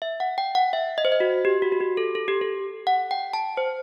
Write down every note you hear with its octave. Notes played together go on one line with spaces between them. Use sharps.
E5
F#5
G5
F#5
E5
D#5
C5
D#5
F#4
G4
F#4
F#4
G4
A4
A4
G4
A4
F#5
G5
A5
C5